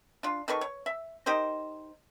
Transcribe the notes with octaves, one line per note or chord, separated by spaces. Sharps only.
D4 F4
D#3 A4 B4 C#6
C#5
E5
D#4 G4 A#4 C5